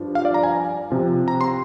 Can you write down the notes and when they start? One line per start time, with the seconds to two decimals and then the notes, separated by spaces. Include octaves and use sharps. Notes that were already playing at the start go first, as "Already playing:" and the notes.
Already playing: G2 F3 D4 F4
0.15 F5
0.25 D5
0.34 A#5
0.43 G#5
0.90 C3 F3 C4 F4
1.28 A#5
1.41 C6